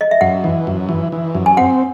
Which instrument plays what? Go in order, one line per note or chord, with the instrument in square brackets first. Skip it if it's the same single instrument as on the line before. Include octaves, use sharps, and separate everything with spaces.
[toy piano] D#5
E5
[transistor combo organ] F#2 [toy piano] F#5
[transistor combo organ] E3
F#2
E3
E3
F#2
[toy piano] G#5
[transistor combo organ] C4 [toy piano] F#5